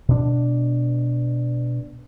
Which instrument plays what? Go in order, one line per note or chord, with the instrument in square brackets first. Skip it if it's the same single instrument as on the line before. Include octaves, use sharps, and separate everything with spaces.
[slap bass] B2 D4